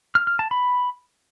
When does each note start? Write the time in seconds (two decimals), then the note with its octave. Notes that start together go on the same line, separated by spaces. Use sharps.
0.15 F6
0.27 F6
0.39 A5
0.51 B5